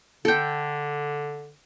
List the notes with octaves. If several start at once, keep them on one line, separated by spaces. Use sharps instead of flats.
D3 A4 G5